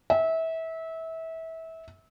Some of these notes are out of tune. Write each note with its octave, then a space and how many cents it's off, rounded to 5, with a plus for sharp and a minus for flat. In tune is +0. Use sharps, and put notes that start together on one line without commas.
E5 -25